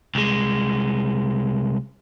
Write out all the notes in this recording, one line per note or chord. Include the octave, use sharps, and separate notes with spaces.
C2 G#3